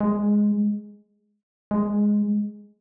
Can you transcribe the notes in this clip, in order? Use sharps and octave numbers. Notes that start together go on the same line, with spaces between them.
G#3
G#3